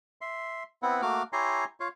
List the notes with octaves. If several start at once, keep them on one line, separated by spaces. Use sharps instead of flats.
E5 C6
B3 C4 E4 B4 F#5
A3 A#3 F#4 D6 F6
E4 G4 C#5 G#5 A#5 C6
F4 C#5 F5